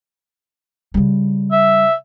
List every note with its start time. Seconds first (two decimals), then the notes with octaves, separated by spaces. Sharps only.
0.94 C#3 G3
1.52 E5